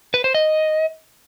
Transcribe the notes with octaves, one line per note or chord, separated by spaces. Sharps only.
B4
C5
D#5